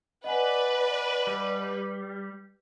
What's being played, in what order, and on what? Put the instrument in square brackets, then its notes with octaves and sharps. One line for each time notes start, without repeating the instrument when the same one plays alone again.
[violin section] B4 D5 [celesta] D#5 F#5 G#5
[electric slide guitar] G3